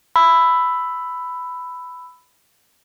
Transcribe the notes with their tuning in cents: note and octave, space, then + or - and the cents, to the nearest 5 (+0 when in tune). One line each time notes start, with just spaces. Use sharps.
B5 +10 E6 +0